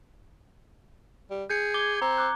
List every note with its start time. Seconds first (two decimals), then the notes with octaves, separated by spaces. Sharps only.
1.30 G3
1.50 G#4 G6 C#7
1.74 D6 G#6 G7
2.02 C4 A#5
2.18 D6 F#6